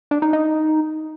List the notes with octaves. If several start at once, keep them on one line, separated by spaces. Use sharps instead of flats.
D4
D#4
D#4